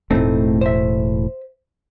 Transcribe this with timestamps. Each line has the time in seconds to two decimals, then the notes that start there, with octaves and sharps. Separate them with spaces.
0.11 E1 A2 A3 C4 D#4
0.61 C5 E5